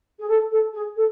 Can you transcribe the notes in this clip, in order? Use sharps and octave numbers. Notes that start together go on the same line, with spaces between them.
G#4
A4
A4
G#4
A4